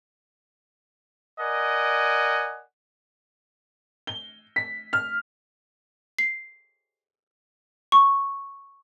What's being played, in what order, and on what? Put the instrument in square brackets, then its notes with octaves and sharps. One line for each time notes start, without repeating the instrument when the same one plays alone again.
[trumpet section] A#4 D5 D#5 F#5 G#5
[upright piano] G7
B6
F6
[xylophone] C7
C#6